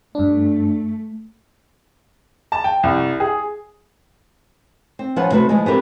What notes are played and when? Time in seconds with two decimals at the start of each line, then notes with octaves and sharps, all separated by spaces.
0.15 G2 A3 D4
2.52 A5
2.64 G5
2.83 C2
3.20 G#4
4.99 C4
5.16 F3 B3 C#4 F#5
5.31 C3 A3 F#4 B4
5.49 E3 F3 G#3
5.66 B3 C4 G4 A#4